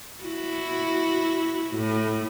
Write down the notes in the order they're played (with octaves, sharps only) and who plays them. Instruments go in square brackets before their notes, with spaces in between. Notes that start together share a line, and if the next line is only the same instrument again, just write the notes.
[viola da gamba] E4 F#4
A2